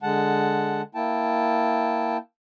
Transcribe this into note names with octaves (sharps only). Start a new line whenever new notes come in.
D3 G#3 F#5 A5
A#3 E4 G5 A5